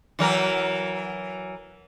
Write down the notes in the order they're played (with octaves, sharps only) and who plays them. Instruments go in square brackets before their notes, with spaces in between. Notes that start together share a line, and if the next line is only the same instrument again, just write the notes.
[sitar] E3 F#3 A#4